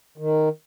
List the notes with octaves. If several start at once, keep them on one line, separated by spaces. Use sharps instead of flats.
D#3